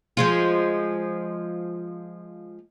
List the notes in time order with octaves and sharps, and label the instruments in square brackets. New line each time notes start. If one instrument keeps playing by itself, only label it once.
[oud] F3 G#3 F4